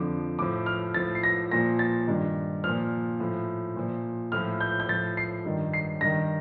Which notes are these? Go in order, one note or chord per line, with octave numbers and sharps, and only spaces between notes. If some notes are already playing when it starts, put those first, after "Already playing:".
Already playing: F2 D3 F3 D6
A2 F3 D6
F6
A2 F3 A6
C7
A#6
A#2 F3 A#6
A6
G2 D#3
A#2 F3 F6
A2 F3
A#2 F3
A2 F3 F6
G6
G6
A2 F3 A6
C7
G2 D#3
C7
G2 D#3 A#6